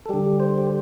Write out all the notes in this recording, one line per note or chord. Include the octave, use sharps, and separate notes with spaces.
A4
D3 G3 G4
C5
G4